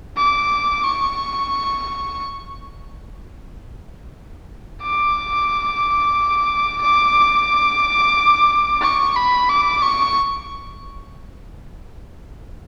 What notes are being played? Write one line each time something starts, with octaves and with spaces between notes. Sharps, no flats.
D6
C#6
D6
D6
C#6
B5
D6
C#6